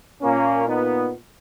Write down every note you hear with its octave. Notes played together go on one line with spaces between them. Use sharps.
A#2 A#3 C#4
B3 D#4